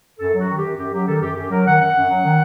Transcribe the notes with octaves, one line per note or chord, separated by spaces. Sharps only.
F#2 A4
F#3 F#4
D#3
F#2 G4
F#2 G4
F#3 G4
D#3 A4
F#2 G4
F#2 G4
F#3 A#4
D#3 F#5
F#2 F#5
F#2
F#3
D#3